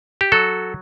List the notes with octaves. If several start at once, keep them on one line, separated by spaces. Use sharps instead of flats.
G4
F#3 F#4 A4